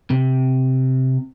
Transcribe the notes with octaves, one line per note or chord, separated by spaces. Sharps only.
C3